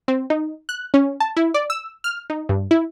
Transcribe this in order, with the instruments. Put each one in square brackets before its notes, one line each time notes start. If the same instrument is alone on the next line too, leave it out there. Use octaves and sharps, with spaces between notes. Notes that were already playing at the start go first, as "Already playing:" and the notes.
[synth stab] C4
D#4
F#6
C#4
A5
E4
D5
E6
F6
D#4
G2
E4